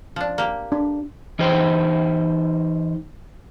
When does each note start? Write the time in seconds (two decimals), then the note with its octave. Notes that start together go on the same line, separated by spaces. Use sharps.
0.16 F3 D4
0.38 A#3 G4
0.72 D4
1.39 E3 D#4 G4 C5 G5